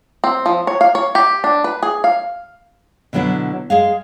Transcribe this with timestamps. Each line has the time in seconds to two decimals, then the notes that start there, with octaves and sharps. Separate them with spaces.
0.24 C4
0.46 F3
0.67 C#5
0.81 F5
0.95 C#5
1.15 G4
1.44 D4
1.64 B4
1.83 G#4
2.04 F5
3.13 B2 D3 F#3 B3 E4
3.70 G#3 G#4 F5